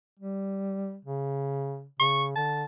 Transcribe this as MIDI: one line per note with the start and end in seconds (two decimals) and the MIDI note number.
0.20 0.97 55
1.05 1.86 49
2.00 2.35 49
2.00 2.25 85
2.36 2.64 50
2.36 2.65 81